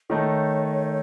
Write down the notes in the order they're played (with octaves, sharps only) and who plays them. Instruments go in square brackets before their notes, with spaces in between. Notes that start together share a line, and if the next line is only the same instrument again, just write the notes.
[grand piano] D#3 A3 D#4 A4 [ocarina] C#5